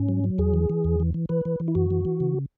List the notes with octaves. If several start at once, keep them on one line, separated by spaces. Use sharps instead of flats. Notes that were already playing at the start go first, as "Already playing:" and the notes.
Already playing: G#2 C#4
F#3
F#3
E2 G#4
E3
E3
E2
E3
E3
E3 B4
E3
E3
E4
F#2 F#4
E3
E3
C#3